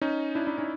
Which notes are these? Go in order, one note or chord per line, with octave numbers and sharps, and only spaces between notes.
C#4 D#4
D4 E4
D4 E4
C#4 D#4